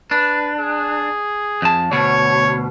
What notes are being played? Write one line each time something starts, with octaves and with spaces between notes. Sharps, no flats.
D4 B4
G#4
F2 A5
D2 B2 C#5